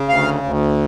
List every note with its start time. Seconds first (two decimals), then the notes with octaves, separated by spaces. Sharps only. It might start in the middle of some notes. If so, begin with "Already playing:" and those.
Already playing: C#3
0.09 D2 F5
0.43 D2